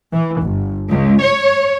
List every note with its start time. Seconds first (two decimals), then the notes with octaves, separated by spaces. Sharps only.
0.12 E3
0.41 G1
0.91 C#2
1.23 C#5